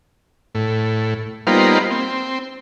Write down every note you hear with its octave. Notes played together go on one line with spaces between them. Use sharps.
A2
G3 A#3 B3 D#4 F4 C5
C4